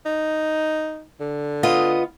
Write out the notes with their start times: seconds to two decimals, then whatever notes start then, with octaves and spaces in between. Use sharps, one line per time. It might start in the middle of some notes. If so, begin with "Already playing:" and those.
0.06 D#4
1.20 D3
1.63 B3 F4 D#5